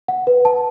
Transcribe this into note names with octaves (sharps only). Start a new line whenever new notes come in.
F#5
B4
A5